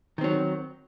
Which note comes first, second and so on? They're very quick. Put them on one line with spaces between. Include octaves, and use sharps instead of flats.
D#3 C4 F#3